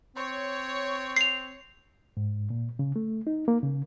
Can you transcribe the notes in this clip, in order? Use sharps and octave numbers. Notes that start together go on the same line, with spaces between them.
C4 C#5
C7 F7
G#2
A#2
C#3
A3
D#4
A#3
C#3